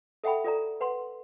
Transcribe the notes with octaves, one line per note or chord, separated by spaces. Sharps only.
A4 E5 F#5 G5 B5
F4 A4 D5 A#5
B4 F#5 C6